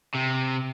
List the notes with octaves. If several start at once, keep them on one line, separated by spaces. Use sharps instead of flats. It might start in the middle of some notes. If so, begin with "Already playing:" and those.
C3